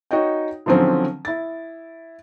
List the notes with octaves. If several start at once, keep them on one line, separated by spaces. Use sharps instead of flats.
D#4 F#4 C#5 D#5 G5
D3 D#3 F3 F#3 C4 C#4
E4 A6